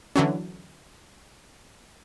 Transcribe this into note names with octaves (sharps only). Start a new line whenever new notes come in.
D3 E3 F#3 C#4